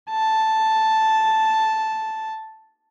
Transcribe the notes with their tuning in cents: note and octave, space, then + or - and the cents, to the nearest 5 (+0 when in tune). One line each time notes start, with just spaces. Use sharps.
A5 +0